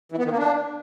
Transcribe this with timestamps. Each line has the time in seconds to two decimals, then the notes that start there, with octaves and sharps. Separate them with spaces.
0.12 E3
0.18 B3
0.25 D#3
0.31 A#3
0.38 D4